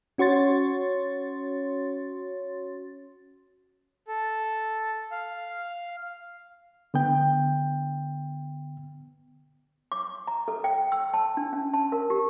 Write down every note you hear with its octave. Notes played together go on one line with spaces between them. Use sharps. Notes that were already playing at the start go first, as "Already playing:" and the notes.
C#4 F#4 C#5 C6 A6
A4
F5
D3 B3 G5
D6
A#5
A4
G5
E6
A5
D4
C#4
A5
A#4
G4